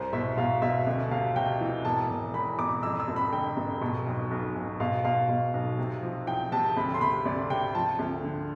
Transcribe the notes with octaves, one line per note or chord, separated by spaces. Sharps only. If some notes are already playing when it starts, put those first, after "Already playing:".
Already playing: C2 C5
B2 E5
B2 F5
B2 E5
D2
C3 F5
C3 G5
E3
E1 A5
E1
E2 B5
E1 D6
F2 E6
E6
F1
B5
D3 G5
F1
B2
B1
B1
B1
B2 F5
B2 F5
B2
B1
C3
F3
E2 G5
C3 A5
D2 B5
C6
C3 B5
D2 D5
C3 G5
F3 A5
D2
D3